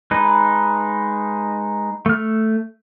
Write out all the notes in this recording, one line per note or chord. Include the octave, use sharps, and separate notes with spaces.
G#3 D#4 B4
A3 F6